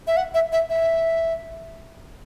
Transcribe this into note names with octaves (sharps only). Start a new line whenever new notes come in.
E5
F#5
E5
E5
E5